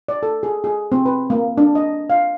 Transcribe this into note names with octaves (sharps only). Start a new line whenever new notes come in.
D5
A4
G#4
G#4
C4
B4
A#3
D4
D#5
F5